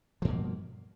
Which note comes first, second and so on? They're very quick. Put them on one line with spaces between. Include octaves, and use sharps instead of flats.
F3 G2 B2 A#3